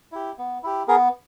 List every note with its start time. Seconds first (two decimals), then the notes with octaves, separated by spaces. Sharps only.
0.12 E4 G4
0.38 B3
0.63 E4 G4
0.88 B3 G#4 A#4